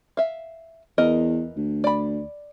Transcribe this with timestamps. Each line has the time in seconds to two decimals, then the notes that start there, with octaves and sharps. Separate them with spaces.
0.17 E5 F5
0.98 E2 E3 A#4 D#5
1.57 D2
1.84 D5 B5